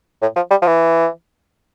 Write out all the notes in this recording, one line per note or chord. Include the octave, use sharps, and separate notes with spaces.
A2
F3
G3
F3
E3